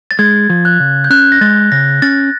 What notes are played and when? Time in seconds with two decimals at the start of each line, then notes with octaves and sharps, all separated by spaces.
0.11 A6
0.19 G#3 G#6
0.50 F3
0.65 F#6
0.80 C#3
1.04 G6
1.10 C#4 F#6
1.32 A#6
1.41 G#3 A6
1.72 C#3 A#6
2.02 C#4 A6